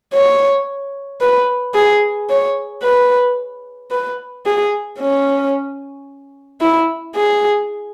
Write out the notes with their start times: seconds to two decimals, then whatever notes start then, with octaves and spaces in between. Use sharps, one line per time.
0.14 C#5
1.21 B4
1.75 G#4
2.30 C#5
2.83 B4
3.91 B4
4.46 G#4
4.99 C#4
6.61 E4
7.15 G#4